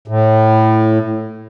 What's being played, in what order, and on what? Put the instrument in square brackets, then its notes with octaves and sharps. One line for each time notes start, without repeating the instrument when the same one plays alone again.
[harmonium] A2